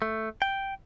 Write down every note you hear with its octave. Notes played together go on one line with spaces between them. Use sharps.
A3
G5